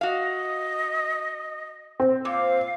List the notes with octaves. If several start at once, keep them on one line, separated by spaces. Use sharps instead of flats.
F#4 D#5 F5
C4
A#2 F5